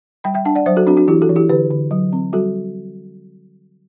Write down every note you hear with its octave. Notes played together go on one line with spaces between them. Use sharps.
G3 G5 B5
E5 G5
D4 F#5 A5
D5 F#5
F#3 C5 E5
F#4 A4
C4 D4 F#4
D4 F#4
E3 E4 G4
F#4 A4
E3
E4 G4
D3 G4 B4
D3
F#3
C4
G3 F#4 A4